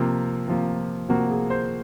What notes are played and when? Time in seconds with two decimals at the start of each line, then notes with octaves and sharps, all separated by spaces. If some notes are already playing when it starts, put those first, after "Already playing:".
Already playing: C3 F3 A#3 F4
0.48 C3 F3 A#3
1.09 C3 F3 A#3 F#4
1.30 G#4
1.50 C5